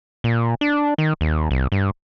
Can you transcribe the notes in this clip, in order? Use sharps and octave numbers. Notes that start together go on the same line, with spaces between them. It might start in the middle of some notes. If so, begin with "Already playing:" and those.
A#2
D4
D#3
D#2
C2
G2